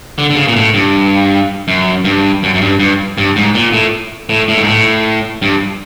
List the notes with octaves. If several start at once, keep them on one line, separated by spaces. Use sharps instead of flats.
D3
D3
C#3
A#2
A2
G2
F#2
G2
F#2
F#2
G2
G2
G2
G#2
A#2
A2
A2
A2
G#2
A2
G2